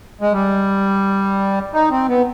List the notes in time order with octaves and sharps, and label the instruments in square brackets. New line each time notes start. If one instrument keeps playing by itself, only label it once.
[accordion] G#3
G3
D#4
C4
B3